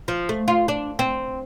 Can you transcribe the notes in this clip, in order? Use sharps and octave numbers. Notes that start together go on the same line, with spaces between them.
F3
A3
F4
D4
C4